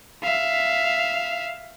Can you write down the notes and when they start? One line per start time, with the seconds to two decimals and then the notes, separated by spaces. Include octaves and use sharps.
0.23 E5 F5